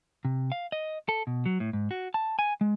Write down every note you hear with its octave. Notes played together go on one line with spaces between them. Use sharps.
C3
F5
D#5
A4
B2
F#3
A2
G#2
F#4
A5
G#5
G#3